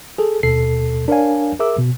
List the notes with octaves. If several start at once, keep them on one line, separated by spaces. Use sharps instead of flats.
G#4 A4
D#2 B2 A4 C7
D4 A#4 C#5 D5 F5 G#5
G#4 A#4 E5 D6 E6
B2